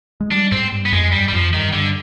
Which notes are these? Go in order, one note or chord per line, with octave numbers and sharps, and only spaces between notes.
G#3
G3 D4
G#2 C4
G2
B3
F2 G#3
G2 G3
G3
F2 F3
G2 D#3
G2 D3